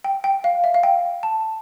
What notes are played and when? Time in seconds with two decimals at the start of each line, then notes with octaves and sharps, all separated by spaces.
0.04 G5
0.24 G5
0.44 F5
0.64 E5
0.74 F5
0.83 G5
1.23 A5